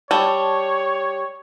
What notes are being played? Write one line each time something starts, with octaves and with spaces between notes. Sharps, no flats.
G3 C#5 A5 E6